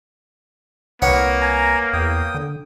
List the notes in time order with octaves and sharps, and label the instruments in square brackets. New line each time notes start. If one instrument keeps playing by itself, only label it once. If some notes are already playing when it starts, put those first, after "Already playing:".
[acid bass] C2 [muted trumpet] A#3 [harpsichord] B3 C#5 F#5
[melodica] G#5 A#5
[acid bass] E2 [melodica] G5 D#6
[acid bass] D3